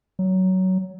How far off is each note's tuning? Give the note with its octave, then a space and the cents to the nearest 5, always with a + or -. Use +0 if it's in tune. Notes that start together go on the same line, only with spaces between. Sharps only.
F#3 +15